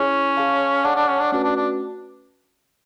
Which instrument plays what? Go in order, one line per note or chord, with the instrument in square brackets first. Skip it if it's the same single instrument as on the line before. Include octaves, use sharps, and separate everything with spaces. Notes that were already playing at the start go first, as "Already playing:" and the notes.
Already playing: [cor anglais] C#4 [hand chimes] E4 G#4 C#5
[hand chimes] G#4 C#5 F5 A5
[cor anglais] D4 [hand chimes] G#4 C#5 F#5 A5
[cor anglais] D4
C#4
D4
[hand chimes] A3 C#4 F#4 B4 [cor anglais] D4
[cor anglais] D4
D4